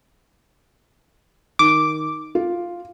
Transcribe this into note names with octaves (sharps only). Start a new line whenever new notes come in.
D#3 D6
F4